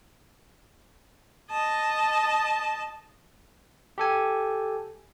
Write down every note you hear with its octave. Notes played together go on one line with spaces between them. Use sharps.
D#5 A5
G4 A4 G#5